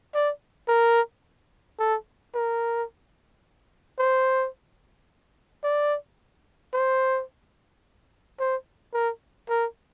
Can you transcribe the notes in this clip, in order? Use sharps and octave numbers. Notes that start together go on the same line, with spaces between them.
D5
A#4
A4
A#4
C5
D5
C5
C5
A#4
A#4